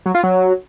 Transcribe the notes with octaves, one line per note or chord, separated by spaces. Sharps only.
F#3
F4
F#3